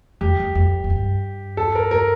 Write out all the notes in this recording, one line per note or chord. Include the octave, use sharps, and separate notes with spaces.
F2 G4
F2
F2
F2
G2
A4
A#4
A#4